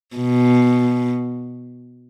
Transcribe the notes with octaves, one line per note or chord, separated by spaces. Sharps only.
B2